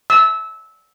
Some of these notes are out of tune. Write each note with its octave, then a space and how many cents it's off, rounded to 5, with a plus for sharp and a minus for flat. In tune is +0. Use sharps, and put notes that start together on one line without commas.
E6 -20